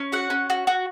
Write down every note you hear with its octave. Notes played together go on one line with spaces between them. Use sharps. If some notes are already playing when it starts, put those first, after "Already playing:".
Already playing: C#4
F#4 F#5
C#4
F#4
F#4